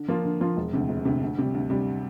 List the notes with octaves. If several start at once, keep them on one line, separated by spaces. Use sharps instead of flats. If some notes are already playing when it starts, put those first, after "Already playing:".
Already playing: D3
F3 A#3 F4
D3
F3 A#3 F4
E1
D2 C3
E1
D2 C3
D2
C3 G3
D2
C3 G3